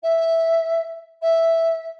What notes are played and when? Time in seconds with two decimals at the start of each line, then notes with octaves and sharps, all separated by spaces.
0.03 E5
1.21 E5